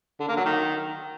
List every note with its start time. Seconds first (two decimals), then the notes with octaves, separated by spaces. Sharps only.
0.20 D3
0.28 A#3
0.37 F#3
0.45 D#3